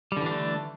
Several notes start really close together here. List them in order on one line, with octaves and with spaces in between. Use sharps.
G3 D3 E3 D4 A3